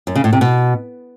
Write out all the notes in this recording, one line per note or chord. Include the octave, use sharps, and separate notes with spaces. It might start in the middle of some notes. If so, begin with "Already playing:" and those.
F#2
C#3
A2
C3
B2